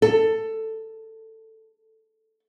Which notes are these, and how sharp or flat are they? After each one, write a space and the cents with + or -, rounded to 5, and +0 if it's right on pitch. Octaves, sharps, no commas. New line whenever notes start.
A4 +10